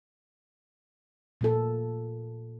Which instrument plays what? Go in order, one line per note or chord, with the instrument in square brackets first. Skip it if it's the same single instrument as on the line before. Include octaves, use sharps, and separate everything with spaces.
[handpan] A#2 A#3 A4